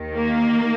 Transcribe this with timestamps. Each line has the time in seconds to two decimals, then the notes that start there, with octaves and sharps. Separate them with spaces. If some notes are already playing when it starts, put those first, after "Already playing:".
Already playing: D#2 D#3
0.15 A#3